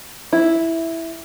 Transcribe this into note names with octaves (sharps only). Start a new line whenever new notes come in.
E4